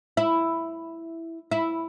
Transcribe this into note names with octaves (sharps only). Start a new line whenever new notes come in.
E4
E4